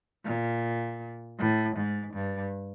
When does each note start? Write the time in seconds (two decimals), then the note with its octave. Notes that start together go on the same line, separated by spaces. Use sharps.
0.25 A#2
1.39 A2
1.76 G#2
2.14 G2